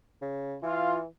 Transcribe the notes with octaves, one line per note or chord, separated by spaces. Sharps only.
C#3
E3 F4